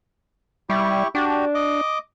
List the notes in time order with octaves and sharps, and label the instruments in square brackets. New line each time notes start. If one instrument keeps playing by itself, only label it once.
[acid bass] G3 [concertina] E4 G4 C#6
[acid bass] D4 [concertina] F#4 G4
[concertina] D#5 D6